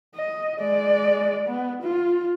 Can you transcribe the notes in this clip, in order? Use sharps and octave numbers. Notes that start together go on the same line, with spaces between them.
D#5
G#3 D5
B3
F4